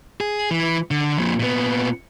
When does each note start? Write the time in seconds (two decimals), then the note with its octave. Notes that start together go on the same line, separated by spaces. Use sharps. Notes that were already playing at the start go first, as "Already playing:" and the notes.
0.21 G#4
0.51 E3
0.91 D3
1.18 F2 A#2
1.40 A#2 B3